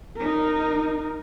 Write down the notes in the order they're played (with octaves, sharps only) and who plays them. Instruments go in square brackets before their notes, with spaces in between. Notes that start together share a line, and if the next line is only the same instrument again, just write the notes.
[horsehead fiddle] D#4 A#4